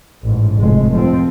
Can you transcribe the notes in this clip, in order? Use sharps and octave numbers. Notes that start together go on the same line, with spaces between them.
A1 G#2
F1 G#3
F3 C4